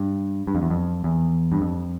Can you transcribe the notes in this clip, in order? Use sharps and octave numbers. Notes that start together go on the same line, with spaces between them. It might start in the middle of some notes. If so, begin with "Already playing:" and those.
Already playing: G2
G2
F2
E2
F2
E2
G2
F2